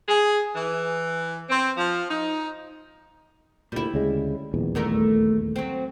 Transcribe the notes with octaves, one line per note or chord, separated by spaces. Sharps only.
G#4
E3
C4
F3
D#4
D2 A#2 G3 E4
D2 C#3 G#3
D#1 A#1 E2
G2 A3 A#4
F#3 C4